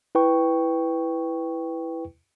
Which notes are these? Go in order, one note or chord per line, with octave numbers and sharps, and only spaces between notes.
E4 B4 G5 C#6